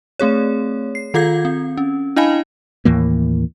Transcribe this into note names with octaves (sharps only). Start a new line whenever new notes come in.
A3 C4 G#4 C#5
C7
D#3 F4 A4 F5 G6 G#6
C4
C#4
D4 E4 D#5 F5 G#5 B5
D#2 A2 E3 A#3